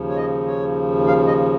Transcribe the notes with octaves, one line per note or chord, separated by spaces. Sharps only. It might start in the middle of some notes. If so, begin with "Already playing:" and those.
Already playing: D#2 C#3 F3
C#5
D#5
C#5
F5
D#5